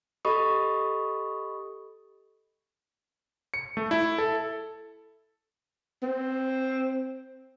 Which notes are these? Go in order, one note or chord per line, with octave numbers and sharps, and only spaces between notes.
G4 A4 D#5 B5 C#6 D#6
C#7
A3
E4
A4
C4